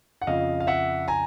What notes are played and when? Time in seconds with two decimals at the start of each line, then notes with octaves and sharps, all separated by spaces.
0.22 F#5
0.27 F2 C#3 F3 D#5 F5
0.60 F5
0.67 E5 F#5
1.08 G#5 A#5